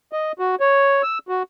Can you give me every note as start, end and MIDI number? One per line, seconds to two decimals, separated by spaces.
0.12 0.32 75
0.39 0.55 66
0.60 1.02 73
1.03 1.18 88
1.29 1.43 66